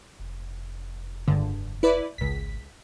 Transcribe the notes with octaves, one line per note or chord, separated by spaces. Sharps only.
F1
C#2 G2 D3
E4 B4 D5
G#1 C#2 B6